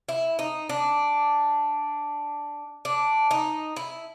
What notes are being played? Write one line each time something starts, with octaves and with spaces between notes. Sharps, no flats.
E4
D#4
D4
D4
D#4
E4